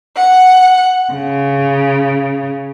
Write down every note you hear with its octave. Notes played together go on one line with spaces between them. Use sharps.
F#5
C#3